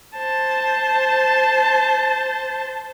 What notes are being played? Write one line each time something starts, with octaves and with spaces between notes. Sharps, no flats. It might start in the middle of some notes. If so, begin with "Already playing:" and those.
C5 A5